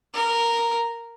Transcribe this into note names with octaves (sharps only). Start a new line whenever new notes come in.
A#4